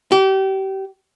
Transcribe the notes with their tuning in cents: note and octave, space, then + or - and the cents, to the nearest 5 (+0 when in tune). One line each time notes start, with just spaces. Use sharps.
G4 -30